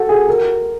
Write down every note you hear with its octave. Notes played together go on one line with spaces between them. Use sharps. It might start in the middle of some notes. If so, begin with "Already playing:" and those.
Already playing: F#4 A4
G#4
A#4